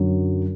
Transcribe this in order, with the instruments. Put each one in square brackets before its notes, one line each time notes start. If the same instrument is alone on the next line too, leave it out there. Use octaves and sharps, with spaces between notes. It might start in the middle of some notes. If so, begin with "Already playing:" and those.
Already playing: [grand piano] F#2 D3 F#3